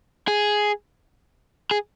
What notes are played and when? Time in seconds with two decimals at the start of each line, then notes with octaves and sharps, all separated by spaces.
0.28 G#4
1.71 G#4